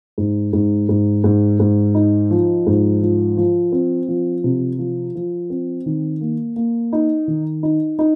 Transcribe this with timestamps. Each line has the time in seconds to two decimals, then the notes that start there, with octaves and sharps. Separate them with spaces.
0.18 G#2
0.53 G#2
0.89 G#2
1.24 G#2
1.60 G#2
1.94 D#4
2.31 F3
2.67 G#2
3.02 F3
3.37 F3
3.72 C4
4.08 F3
4.44 C3
4.79 F3
5.15 F3
5.50 C4
5.86 D#3
6.21 A#3
6.56 A#3
6.93 D#4
7.28 D#3
7.63 D#4
7.99 D#4